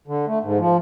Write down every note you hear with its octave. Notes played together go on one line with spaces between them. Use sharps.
D3
A3
G#2
F3